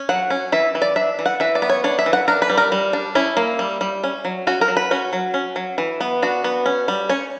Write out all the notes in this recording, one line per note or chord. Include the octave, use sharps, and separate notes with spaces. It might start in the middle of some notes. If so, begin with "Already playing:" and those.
Already playing: C#4
F#3 F#5
C#4
E3 E5
E3
D5
D4 E5
E3
F#5
E3 E5
D5
B3
C#5
D4 C#5
E5
E3
F#5
D4 A#4
B4
G3
A#4
G3
D4
C#4 E4
A#3
G3
G3
C#4
F#3
C#4 F#4
A#4
F#3
B4
C#4 F#4
F#3
C#4
F#3
E3
B3
D4 F#4
B3
C#4
G3
C#4 C#5